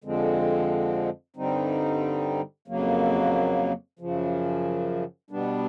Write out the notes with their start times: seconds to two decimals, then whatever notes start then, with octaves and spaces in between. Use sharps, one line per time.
0.04 F2 D3 F3 G#3 C4
1.36 G2 D3 G3 C4 D#4
2.68 F2 C#3 F#3 A#3
3.99 F#2 C#3 F3
5.30 B2 G3 B3 D4